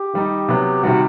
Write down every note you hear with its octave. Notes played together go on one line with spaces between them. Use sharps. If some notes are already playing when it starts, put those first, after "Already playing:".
Already playing: G4
D#3 G3 D#4
C3 F#3 B3
C3 D#3 G3 F#4